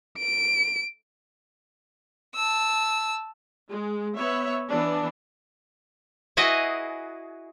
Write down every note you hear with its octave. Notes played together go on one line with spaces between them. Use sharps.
D7
A5 E6
G#3
B3 C#5 E5
E3 B3 D4
E4 F#4 G#4 B4 D#5